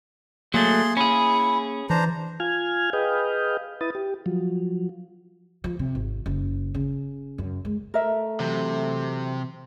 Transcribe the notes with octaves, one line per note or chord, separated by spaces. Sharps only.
F#3 A3 A#3 G#4 C6
C#4 E4 G#4
E3 D4 C5 A#5
F4 G#5 F6 G#6
G#4 B4 D#5 F5 G5
E4 B4 D#6 A6
G4
F3 F#3
F3
C3
G#1
F#1
C#3
F#2
G#3
A3 A#4 E5
C3 E3 F#3